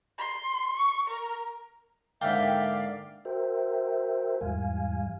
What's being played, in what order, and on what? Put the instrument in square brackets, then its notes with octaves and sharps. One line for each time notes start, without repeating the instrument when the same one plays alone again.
[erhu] C6
C#6
A#4
[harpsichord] G#2 D3 A#3 [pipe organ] D5 F5 [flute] E5 [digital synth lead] G5
[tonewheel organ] F#4 A#4 C5 E5 G5
E2 G#2 E3 G3 F5 G#5